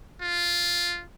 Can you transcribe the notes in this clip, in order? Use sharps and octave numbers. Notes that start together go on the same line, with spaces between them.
F4